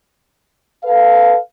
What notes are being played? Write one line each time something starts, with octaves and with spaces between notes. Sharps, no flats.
A4 B4 F5